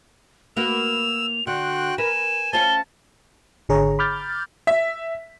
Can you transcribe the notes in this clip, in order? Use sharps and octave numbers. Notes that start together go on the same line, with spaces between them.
A#3 F#4 B4 E6 F7
D3 F#4 G5 C6 F#6
A#4 B4 G#5 E7
C#4 F4 C5 A5 G7
G#1 D3 G#4 C#5 A#5
B5 D6 F6 G6 A6
E5 B6